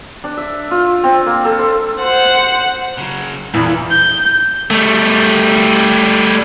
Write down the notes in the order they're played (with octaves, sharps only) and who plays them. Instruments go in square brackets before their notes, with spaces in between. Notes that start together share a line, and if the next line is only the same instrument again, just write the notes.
[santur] D4
E5
F4
C4
A#3
A4
C6
[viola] C5 F#5
[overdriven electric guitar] C#3 F#3
[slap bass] E2 [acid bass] A#2 [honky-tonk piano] E3 [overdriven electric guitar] A#3 B5
[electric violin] G6
[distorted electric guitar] G3 A3